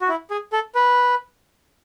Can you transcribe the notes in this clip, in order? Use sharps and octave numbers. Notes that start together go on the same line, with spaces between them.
F#4
E4
G#4
A4
B4